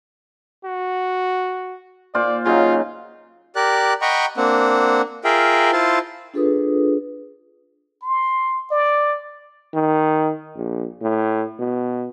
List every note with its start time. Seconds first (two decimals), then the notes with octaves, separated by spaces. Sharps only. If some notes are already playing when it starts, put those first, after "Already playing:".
0.65 F#4
2.14 A#2 F4 C5 D5
2.46 C#3 F#3 D#4 F4
3.56 G4 A#4 D5 F#6
4.02 D#5 F#5 G5 A#5 B5 C#6
4.37 A#3 C4 D4 F#5
5.24 F4 G#4 A#4 E5 F5 G5
5.73 E4 F4 C5 F5 A5
6.34 D4 F4 G#4 A4 B4 D#6
8.03 C6
8.71 D5
9.74 D#3
10.56 A#1
11.02 A2
11.59 B2